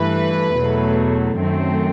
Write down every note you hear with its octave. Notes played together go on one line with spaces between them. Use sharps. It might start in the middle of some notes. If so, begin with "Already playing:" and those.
Already playing: G2 E3 A3 B4
E2 B2 F#3 A3
F#2 D#3 A3 C4